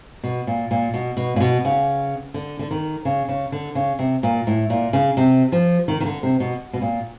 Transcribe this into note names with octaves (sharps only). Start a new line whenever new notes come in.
B2
A#2
A#2
B2
B2
A#2
B2
C#3
D3
D3
D#3
C#3
C#3
D3
C#3
C3
A#2
A2
A#2
C#3
C3
F3
D#3
D#3
D3
C3
B2
B2
A#2